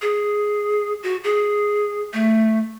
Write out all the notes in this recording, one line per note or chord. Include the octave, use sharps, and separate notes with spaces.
G#4
F#4
G#4
A3